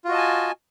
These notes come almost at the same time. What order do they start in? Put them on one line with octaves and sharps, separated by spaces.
F4 F#4 D#5 A5 G#5